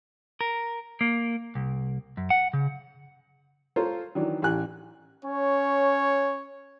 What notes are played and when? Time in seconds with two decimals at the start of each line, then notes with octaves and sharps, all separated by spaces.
0.41 A#4
1.01 A#3
1.55 C2
2.17 F#2
2.30 F#5
2.53 C#3
3.76 F4 A4 C5 C#5 A#5
4.15 D#3 E3 F#3 D4
4.42 A1 G4 G#5 F#6
5.25 C#4 C#5